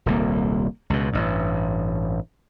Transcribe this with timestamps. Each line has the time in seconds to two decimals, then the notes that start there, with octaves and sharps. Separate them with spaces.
0.06 D#1 C2 A#3
0.90 C#2 B2
1.13 A1 G2